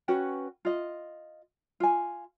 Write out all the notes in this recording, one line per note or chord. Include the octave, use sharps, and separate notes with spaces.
C#4 F#4 B4 G5
F4 D#5
F4 G#5